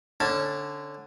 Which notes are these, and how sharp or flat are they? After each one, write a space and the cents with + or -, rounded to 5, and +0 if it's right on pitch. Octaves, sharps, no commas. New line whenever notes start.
D3 +0 C#4 -20 A5 +0